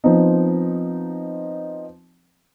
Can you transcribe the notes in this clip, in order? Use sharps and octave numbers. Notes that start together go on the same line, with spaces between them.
F3 B3 C4 D#4